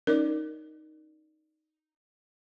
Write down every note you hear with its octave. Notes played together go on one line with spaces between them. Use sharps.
C#4 D#4 A#4 D5